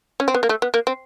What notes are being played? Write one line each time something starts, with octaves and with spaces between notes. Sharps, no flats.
C#4
C4
B3
A#3
A3
B3
A#3
C4